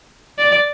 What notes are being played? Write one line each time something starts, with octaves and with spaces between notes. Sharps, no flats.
D5